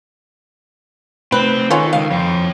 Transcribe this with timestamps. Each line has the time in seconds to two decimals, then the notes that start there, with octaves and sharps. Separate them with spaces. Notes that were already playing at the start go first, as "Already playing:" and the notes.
1.32 C3 A3 C4 B4
1.70 D#3 B3 C#4 F4 A4
1.93 C#2 F5
2.11 F2 C#5 G5